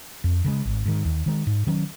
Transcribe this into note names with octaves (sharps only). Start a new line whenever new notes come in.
F2
C#3 F3 G#3
G#1
G#2 D#3
D#2
D#3 G#3
G#2
D#3 F#3 C#4